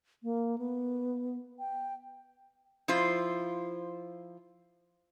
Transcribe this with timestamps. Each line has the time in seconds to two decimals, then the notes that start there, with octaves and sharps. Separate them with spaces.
0.23 A#3
0.58 B3
1.59 G5
2.88 F3 E4 F4 C5